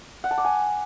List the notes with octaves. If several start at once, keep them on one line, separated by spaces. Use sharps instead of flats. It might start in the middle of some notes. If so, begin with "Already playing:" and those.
F#5
A5
D6
G#5